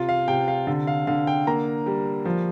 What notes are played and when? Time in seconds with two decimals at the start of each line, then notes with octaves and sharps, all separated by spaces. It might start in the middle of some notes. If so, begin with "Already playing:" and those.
Already playing: C3 F4
0.09 F5
0.28 C3 G5
0.48 F5
0.67 D3
0.87 F5
1.07 D3 F5
1.27 G5
1.47 A#3 A#5
1.86 G3
2.25 F3